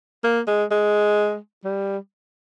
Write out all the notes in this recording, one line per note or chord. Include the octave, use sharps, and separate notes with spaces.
A#3
G#3
G#3
G3